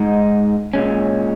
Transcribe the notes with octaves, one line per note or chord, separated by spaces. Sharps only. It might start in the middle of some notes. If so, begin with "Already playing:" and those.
Already playing: G#2 G#3 D#4
A#2 G#3 C#4